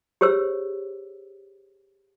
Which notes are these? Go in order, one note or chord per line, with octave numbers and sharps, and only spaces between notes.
G4 G#4 C5 C#5 E6